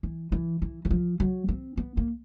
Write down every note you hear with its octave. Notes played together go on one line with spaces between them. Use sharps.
E3
E3
E3
E3
F3
F#3
C4
B3
A#3